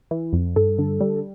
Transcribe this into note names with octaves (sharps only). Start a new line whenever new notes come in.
E3
F2
G2 A4
D3
G3